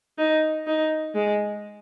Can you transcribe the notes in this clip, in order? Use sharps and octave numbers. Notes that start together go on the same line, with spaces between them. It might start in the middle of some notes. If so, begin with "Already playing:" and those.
D#4
D#4
G#3